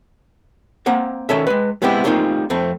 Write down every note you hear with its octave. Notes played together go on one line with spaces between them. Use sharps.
A#3 C4 F#5 A#5
D#3 C#4 A4 E5
G#3 B4
G3 G#3 B3 C4 E4 G4
G3 A3 A#3 C4 D#4 F4
F2 A3 C4